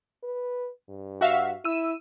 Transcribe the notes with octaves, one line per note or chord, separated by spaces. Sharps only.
B4
G2
F#4 E5 F5
E4 E6 D#7